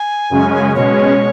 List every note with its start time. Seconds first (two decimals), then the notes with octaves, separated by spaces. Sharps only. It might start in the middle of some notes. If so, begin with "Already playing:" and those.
Already playing: G#5
0.30 F#2 C#3 G#3 C#4
0.75 B2 G#3 C#4 C#5